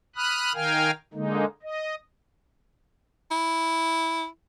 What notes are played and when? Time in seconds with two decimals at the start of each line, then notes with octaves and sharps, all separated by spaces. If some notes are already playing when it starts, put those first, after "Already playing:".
0.16 B5 D#6 F6 F#6
0.54 D#3 A#4 F5 G5 G#5 F6
1.13 D3 G#3 A#3 D#4
1.62 D#5
3.31 E4